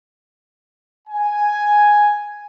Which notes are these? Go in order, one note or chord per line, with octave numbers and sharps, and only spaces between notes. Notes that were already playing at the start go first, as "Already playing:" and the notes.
G#5